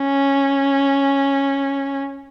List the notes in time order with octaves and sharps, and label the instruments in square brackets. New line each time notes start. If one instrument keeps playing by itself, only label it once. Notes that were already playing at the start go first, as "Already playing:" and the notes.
Already playing: [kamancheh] C#4